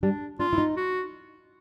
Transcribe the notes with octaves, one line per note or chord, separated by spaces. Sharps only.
G3 D4
D4 F4
E4
D#4
F#4